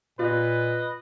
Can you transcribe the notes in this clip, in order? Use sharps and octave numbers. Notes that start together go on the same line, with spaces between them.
A#2 F4 B4 D#5